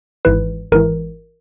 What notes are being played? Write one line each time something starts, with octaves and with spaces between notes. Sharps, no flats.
G#1 G#2 E3 B4
G#1 G#2 E3 A#4